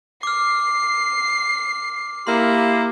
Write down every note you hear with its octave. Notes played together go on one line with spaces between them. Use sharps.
D6 F6 C7
A#3 E4 G4 C6